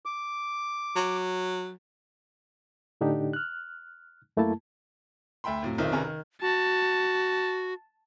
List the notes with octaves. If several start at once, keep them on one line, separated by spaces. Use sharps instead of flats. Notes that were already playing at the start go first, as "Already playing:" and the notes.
D6
F#3
A2 D3 D4 D#4 G4
F6 F#6
F#2 A3 A#3 E4 A5
D2 E5 G5 B5 C6
F2 A2 F#3
B1 D#3 C4 D#4 F4 E5
C3 D#3 C#4 G#4 A#4 B4
D#3
F#4 A5